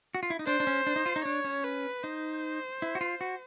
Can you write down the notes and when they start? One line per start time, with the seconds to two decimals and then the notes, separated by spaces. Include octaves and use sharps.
0.15 F#4
0.23 F4
0.30 E4
0.39 D#4
0.47 D4 C5
0.60 D4
0.67 C#4
0.87 D4
0.96 D#4
1.06 F4
1.16 D#4
1.25 D4 C#5
1.44 C#4
1.65 B4
2.03 D#4 C5
2.82 E4
2.95 F#4
3.01 F4
3.21 F#4